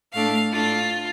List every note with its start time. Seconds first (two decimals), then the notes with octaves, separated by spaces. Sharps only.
0.13 A2 A3 D4 F5
0.52 A2 A3 D4 F4